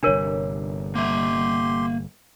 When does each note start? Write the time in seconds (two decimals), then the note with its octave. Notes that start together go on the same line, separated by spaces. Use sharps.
0.03 G1 C3 D4 A#4 C#5
0.95 A#3 G4 E5 C6